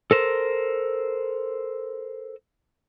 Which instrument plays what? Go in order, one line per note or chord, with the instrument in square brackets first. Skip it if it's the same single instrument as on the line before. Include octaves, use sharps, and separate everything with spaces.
[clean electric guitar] A4 A#4 C5